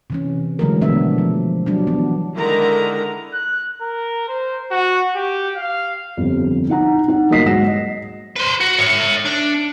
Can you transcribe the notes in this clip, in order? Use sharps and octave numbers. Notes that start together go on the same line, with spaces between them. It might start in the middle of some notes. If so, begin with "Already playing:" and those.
C3 E3 C#4
D3 E3 F#3 G#3 A3 A#4
B2 F3 A3 B3 D4 E5
F3
F#3 G3 D4
E3 F#3 B3
D3 D#3 G#3 E4 A#4 A#5
F#6
A#4
C5
F#4
G4
F5
G1 C2 F2
D#4 F#5 A#5
D#4 F#5
G1 F#3 A#3 D#5 B6 C7
G#2 F#3 F#5 A#6 E7
D#5
B4 C5
F#4
C#5 E5
D4